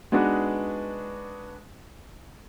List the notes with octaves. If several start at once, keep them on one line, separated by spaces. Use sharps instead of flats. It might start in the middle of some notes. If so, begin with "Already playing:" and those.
G#3 B3 D4 D#4 F#4 B4